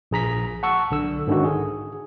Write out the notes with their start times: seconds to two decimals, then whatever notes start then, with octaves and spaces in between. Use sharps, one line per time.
0.11 A#1 G#4 A#5 B6
0.63 F#5 A5 C#6 E6
0.91 B1 D3 E6
1.27 G#2 D3 D#3 C#4 D#4 F#4
1.45 G#4